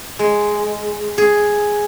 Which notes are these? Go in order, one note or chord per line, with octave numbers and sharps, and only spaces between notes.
G#3
G#4